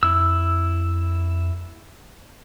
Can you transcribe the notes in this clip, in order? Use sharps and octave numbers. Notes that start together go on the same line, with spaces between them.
F2 E4 E6